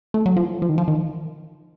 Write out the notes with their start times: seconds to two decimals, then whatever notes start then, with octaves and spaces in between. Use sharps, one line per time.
0.14 A3
0.26 F#3
0.36 F3
0.62 F3
0.69 D#3
0.78 F3
0.88 D#3